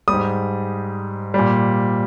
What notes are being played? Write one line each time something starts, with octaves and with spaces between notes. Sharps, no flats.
G3 D#6
G#2
A#2 G3